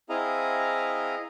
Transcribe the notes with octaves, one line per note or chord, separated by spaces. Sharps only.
C4 E4 G#4 D#5 F5 A#5